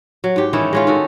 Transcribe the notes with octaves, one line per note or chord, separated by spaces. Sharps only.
F#3
G#2 G4
D#3 E3 C#4 E4
G#3 C#4 F4
D#3 F#4 A4